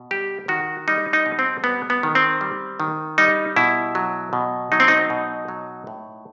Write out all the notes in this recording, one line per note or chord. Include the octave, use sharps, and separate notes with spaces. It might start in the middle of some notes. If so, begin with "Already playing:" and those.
Already playing: B2
G3 G4
D#3 F#4
G3 D#4
D#4
B2
C4
G3 B3
B3
D#3
C4
G3
D#3
G3 D#4
B2 E4
F#3
B2
F#3 D#4
C4
D#4
B2
F#3
A2